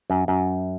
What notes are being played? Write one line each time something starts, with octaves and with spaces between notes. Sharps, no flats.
F#2
F#2